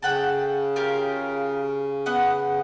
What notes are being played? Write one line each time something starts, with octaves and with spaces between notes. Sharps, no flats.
C#3 A4 F#5 G5
F4 G4 A#4
B3 F#5